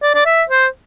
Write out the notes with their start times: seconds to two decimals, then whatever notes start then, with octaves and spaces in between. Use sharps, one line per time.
0.03 D5
0.15 D5
0.26 E5
0.50 C5